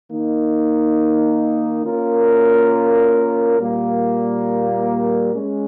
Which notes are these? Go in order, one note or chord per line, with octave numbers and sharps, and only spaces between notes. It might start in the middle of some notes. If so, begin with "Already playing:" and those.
D#3 A#3 D#4
A#3 C#4 F4 A#4
A#2 G3 A#3
G#3 C#4